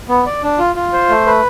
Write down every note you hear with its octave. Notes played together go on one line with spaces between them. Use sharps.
B3
D5
D4
F4
F4
C5
A3
B4